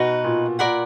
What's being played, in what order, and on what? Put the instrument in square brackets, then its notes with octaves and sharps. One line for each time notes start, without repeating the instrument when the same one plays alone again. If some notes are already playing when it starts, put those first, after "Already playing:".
Already playing: [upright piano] B2 [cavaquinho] D#4 F#4 B4
[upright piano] A#2
[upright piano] A#2 [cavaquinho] A#4 D5 F#5 B5